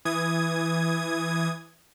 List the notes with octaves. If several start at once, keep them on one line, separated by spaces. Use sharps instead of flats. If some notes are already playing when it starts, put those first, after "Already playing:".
E3 D#6 G#6